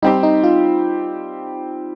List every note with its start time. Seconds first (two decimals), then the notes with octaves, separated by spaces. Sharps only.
0.02 G3 C4 D#4 G4
0.23 D#4
0.44 F4